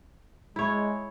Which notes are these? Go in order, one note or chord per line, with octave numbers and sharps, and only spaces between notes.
G#3 E4 C#5